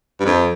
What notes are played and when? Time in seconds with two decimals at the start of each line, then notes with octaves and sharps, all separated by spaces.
0.20 G2
0.25 F2